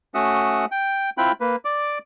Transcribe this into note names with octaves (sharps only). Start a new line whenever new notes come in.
A3 C#4 F#4 E5 F#5 D#6
G5
C4 E4 F4 G5 B5 F#6
A#3 B4
D5 D6